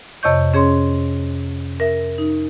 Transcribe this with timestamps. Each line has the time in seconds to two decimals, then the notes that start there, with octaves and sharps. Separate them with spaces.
0.23 F2 C3 C#5 D#5 C#6 G6
0.54 C#4 G#4 C#5 C6
1.80 A#4 E5
2.18 D#4